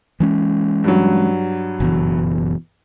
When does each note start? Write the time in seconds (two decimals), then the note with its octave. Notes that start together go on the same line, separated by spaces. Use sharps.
0.20 E3 G#3 C#4
0.84 G2 F#3
1.80 F#1 B2 E3